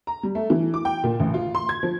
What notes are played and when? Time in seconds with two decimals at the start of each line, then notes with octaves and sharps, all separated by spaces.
0.07 A#5
0.23 G3
0.35 A3
0.50 E3
0.74 D6
0.85 G5
1.04 A#2
1.20 A1
1.34 F4
1.55 C6
1.69 G#6
1.83 F3